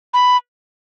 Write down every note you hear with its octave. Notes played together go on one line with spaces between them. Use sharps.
B5